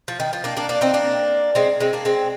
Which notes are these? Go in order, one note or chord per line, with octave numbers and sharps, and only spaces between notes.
F3
D#3
F3
A#3 D4
A#3 D4
A#3 D4
C4 D#4
A#3 D4
G#3 C4
G#3 C4
A#3 D4
G#3 C4